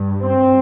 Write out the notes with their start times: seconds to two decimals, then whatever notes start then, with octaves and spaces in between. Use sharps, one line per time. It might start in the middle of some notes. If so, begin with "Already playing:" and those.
Already playing: G2
0.22 C4